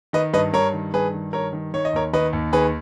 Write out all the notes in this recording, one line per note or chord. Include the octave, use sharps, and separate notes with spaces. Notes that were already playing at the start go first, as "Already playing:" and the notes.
D#3 B4 D#5
G2 B4 D#5
G2 A#4 C#5
D#3
G2 G#4 B4
D#3
G2 A#4 C#5
D#3
D#3 C#5
D#5
D#2 A#4 C#5
D#3 B4 D#5
D#2
D#3 G#4 B4